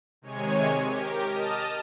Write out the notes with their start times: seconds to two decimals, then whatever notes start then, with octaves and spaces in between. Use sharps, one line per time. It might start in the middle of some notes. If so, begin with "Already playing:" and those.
0.22 C3 D#3 G#3 C#5 G#5
0.84 G4 A#4
1.26 D#5 A5 D#6 F6